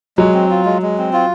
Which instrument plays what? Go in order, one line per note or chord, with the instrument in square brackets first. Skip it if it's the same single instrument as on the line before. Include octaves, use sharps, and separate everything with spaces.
[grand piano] F#3 [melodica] G#3
[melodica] C4
F4
G#3
G#3
C4
F4